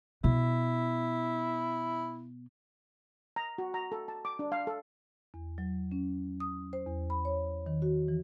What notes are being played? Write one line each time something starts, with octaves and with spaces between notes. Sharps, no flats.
B2 E4
A#5
F#4
A#5
A4
A5
D6
D4
F5
A4
E2
F#3
C#4
D#6
C5
E2
B5
C#5
D#3
F#4
E3